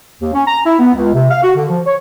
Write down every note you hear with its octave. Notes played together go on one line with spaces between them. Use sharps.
D#2
C#4
A#5
E4
B3
C#2
C3
F5
F#4
D3
F3
C#5